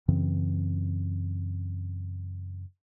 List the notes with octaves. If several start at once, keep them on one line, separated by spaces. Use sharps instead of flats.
F#2 C#3 E3 C4